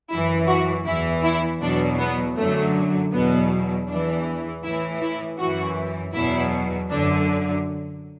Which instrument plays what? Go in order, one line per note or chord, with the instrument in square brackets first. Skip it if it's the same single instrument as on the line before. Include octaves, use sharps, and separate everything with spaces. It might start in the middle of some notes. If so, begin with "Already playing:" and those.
[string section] F#2 E3 E4
F#4
E2 E3 E4
E4
E2 B2 F#3 D4
B3
F#2 D3 F#3 A3
E2 B2 F#3 B3
E2 E3 D4
A2 E3 E4
E4
F#2 E3 F#4
E2 B2 F#3 E4
F#2 D3 F#3 D4